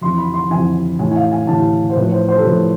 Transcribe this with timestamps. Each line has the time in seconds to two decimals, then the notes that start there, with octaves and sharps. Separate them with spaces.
0.01 F2 E3 C6
0.18 B5
0.34 C6
0.50 F2 E3 G#5
0.99 A2 E3 G#5
1.11 G#5
1.16 F5
1.31 G#5
1.47 A2 E3 A5
1.90 C5
1.96 A2 F3 B4
2.12 C5
2.29 C5
2.38 A4
2.45 A2 F3 B4